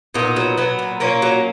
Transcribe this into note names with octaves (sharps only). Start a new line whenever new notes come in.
A#2 B3 D#4
F#3
F#3 B3
A#2
A#2 A#3 C#4
F#3